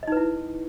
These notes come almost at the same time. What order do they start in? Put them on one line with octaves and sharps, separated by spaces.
D#5 D#4 B4 E4